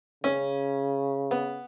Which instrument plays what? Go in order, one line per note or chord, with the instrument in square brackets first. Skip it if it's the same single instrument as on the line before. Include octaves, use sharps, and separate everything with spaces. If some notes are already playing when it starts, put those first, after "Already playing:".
[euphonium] C#3 [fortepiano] C#4
[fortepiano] B3